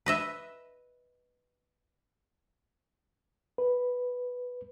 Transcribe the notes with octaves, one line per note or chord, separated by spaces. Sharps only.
B4 D#5 E5
B4